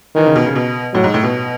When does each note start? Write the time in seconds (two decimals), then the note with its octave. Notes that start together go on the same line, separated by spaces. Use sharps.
0.15 D#3 E3
0.26 C#3
0.36 B2
0.46 C#3
0.55 B2
0.94 A2 F#3
1.04 G#2
1.14 A2
1.23 B2